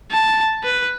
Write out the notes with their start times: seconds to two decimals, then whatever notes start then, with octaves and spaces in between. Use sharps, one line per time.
0.11 A5
0.63 B4